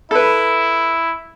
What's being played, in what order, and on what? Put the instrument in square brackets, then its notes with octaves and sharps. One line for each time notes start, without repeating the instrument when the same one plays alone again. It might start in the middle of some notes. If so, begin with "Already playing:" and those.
[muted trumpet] E4 [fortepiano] A4 B4